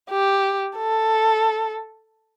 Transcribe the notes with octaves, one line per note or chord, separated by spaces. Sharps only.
G4
A4